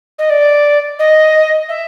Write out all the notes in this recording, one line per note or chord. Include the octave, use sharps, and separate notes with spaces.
D#5
D5
D#5
E5